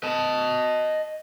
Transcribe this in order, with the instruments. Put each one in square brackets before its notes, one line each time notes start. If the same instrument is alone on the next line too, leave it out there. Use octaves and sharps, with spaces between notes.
[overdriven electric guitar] D#5 A5